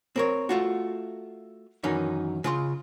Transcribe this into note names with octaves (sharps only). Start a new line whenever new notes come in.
C4 A#4 C#5
A3 F4 F#4
F#2 D#3 E3 C#4 D#4
C#3 F4 C6